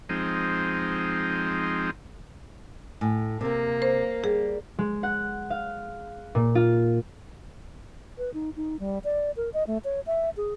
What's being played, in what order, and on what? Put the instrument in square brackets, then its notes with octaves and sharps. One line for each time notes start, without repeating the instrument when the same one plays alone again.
[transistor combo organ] F3 G#3 C4 D#4
[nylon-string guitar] A2 [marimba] G#5
[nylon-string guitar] C3 C4 [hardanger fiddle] A#3
[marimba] C5
[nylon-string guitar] G3 [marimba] G#4
[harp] G#3
F#5
F5
A#2
F4
[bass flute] B4
D#4
D#4
G3
D5
A#4
D#5
A3
C#5
E5
G#4